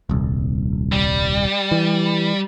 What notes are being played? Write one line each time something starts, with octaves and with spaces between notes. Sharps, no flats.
D#1 C2
G3
E3